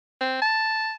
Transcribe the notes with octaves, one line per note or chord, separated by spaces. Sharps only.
C4
A5